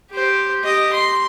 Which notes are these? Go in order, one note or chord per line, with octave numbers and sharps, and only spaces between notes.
G4 C5
G4 D#5
C6